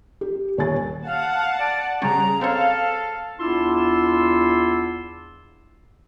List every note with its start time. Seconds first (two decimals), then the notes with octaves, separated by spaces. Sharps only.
0.21 G4
0.57 D#1 C#5 G#5 A6
1.06 F5 F#5 A5
1.58 D5
2.02 C#3 G3 C#4 G#4 A#5
2.41 C4 A4 C5 C#5 F5
3.39 E2 D4 E4 F4 C6 E6